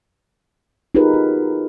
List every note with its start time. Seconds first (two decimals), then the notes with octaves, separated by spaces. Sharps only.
0.95 D#4 F4 G4 G#4 A#4 B4
1.14 F#4